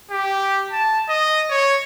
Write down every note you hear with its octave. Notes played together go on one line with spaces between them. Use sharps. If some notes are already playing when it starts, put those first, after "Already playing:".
G4
A5
D#5
C#5